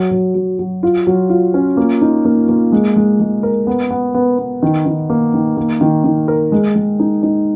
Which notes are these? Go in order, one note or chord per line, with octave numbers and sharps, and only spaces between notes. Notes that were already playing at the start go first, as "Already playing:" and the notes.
Already playing: F#3
F#3
F#3
F#3
F4
F#3
F4
C#4
A#3
D#4
A#3
A#3
G#3
G#3
G#3
A#4
B3
B3
B3
B3
D#3
D#3
A#3
D#3
A#3
D#3
D#3
A#4
G#3
G#3
D#4
D#4